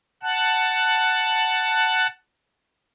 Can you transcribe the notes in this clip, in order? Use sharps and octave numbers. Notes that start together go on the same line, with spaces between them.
F#5 A5 F#6